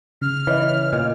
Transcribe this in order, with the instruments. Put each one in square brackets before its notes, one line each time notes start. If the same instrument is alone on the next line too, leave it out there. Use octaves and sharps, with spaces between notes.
[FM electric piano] C#3 [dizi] F6
[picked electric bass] E3 [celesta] C#5 D#5 E5
[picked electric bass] A#2 [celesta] D#5